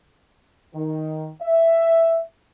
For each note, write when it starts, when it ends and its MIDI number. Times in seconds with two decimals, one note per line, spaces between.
0.74 1.28 51
1.41 2.20 76